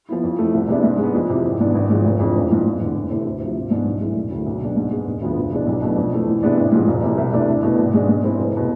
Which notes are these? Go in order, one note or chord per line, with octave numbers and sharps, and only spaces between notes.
F3 B3 E4
F2
E3 A3
C2
C3 G#3 B3 D4
G#2
G#3 B3
F2
C3 E3
G#1
G#2 E3 B3 D4
G#1
G#2 F3 G#3
F1
F2 E3 G#3 D4
A1
G#2 F3
F1
E2 D3
E2
C3 E3 A3 C4
D2
C3 F3
G#1
G#2 E3 B3 D4
B1
A2 E3 G#3
E1
D2 D3
B1
B2 G#3 D4
G#2
G#3 B3
E1
D2 D3 F3 B3
E1
E2 B2 G#3 D4
B1
B2 A3 D4
F2
E3 A3
E2
C3 G#3 B3 D4
A1
G#2 F3 G#3
E1
E2 C3
C2
C3 E3 A3 D4
E2
B2 A3
G#1
G#2 G#3 D4
G#2
G#3 C4 E4
F1
B2